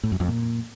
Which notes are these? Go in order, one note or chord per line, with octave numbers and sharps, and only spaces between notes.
A2
F#2
F2
A#2